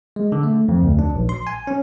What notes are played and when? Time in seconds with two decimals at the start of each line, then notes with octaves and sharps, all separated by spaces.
0.16 G#3
0.32 D3
0.43 A3
0.68 F2
0.83 D2
0.99 D4
1.15 A#1
1.29 C6
1.47 G#5
1.67 C#4